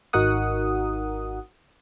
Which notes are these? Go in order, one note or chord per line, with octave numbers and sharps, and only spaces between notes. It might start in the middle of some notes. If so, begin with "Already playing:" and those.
G#1 D#4 F#4 A#4 F#5 D#6